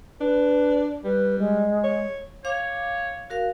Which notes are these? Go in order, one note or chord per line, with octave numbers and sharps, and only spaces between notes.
D4 B4
G3 B4
G#3
C#5
C#5 F5 D6
F#4 A#4 F5